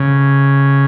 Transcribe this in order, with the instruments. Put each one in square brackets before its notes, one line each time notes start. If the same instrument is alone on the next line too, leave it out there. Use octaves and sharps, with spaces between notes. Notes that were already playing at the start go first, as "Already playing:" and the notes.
Already playing: [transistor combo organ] C#3